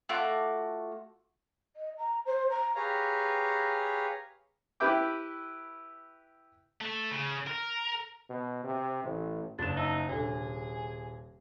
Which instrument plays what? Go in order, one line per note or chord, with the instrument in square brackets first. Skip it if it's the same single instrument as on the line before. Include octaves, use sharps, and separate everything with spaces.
[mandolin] A3 F4 F#4 D6
[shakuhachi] D#5
A#5
C5
A#5
[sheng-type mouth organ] G4 G#4 B4 C#5 F5 A#5
[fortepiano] E4 G4 B4 E5 G5 D6
[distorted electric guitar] A3
C#3
A#4
[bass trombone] B2
C3
A1
[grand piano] F#1 E7 [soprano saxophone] D4 [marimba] A6
[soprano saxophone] D#4 [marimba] E5 A5 E6
[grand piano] D#1 [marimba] C3 D4 A4 [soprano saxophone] G#4